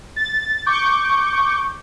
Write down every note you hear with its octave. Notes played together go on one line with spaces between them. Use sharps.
A6
C#6 D6 G6